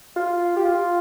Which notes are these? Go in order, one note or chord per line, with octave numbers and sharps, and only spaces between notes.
F4
G4
F4